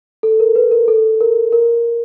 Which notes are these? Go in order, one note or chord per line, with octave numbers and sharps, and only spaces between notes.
A4
A#4
B4
A#4
A4
A#4
A#4